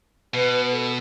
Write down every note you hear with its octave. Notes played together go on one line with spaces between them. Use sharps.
B2 B4
A4